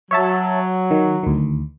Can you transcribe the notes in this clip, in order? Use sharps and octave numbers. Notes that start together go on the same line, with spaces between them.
F#3 C#5 E5 A5
D#3
D2 D#3